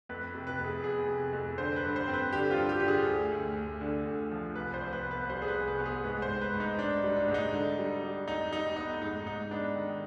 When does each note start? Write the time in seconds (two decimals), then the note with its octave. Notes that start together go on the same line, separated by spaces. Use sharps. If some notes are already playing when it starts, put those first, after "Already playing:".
0.09 F2 B4
0.35 C3
0.47 B4
0.59 F2
0.65 G#4
0.84 B3 G#4
1.08 C3
1.33 F2
1.58 D3 C5
1.76 B4
1.83 G2
1.96 C5
2.08 C4
2.14 B4
2.32 D3 G4
2.51 F4
2.57 G2
2.69 G4
2.80 D3 G4
2.88 G#4
3.07 D2
3.32 D2
3.56 D2
3.81 D3
4.06 D2
4.31 F3
4.55 C2 B4
4.74 C5
4.81 C2
4.93 B4
5.05 B3
5.11 B4
5.30 G3 C5
5.42 G#4
5.48 B4
5.55 C2
5.68 B4
5.79 B3
5.86 G#4
6.04 G#2 B4
6.22 C5
6.29 G#2
6.41 B4
6.54 G#2
6.60 D#4
6.79 G#2 D4
7.04 G3
7.16 D4
7.28 G#2
7.34 D#4
7.53 D3
7.78 G3
8.03 G3
8.28 F2 D#4
8.53 G3 D#4
8.76 B3 D#4
9.02 G#2 D#4
9.26 G#2 D#4
9.51 B3 D4
9.76 D#3